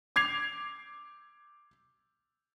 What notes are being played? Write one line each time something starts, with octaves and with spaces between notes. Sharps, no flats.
D6 G#6 C7 F7